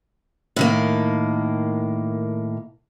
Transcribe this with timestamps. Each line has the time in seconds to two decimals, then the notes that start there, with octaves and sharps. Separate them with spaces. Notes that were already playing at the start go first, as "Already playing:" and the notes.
0.56 A2 D#3 A#3